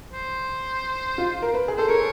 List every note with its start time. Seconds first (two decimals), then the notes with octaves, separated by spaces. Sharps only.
0.13 C5
1.18 F4
1.42 A#4
1.54 B4
1.68 G#4
1.76 A4 C5
1.88 A#4 C#5